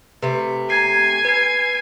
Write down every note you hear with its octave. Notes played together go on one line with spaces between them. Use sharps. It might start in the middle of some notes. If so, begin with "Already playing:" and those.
C3 A3 B4
G#5 A#5 G#6 C7
B4 G#6 C7